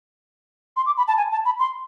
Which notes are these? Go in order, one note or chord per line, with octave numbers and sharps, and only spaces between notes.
C6
D6
B5
A5
G#5
A5
B5
C6